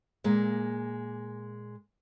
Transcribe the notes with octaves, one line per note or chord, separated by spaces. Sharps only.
A#2 G#3 A#3